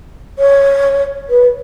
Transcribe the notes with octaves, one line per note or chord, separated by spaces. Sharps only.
C#5
B4